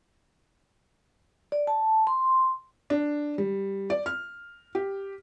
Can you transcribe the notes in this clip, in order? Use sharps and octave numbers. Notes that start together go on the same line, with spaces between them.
D5
A5
C6
D4
G3
D5
F6
G4